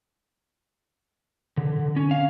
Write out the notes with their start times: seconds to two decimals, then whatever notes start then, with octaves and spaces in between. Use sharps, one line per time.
1.57 D3
1.79 D3
1.96 C#4
2.11 F5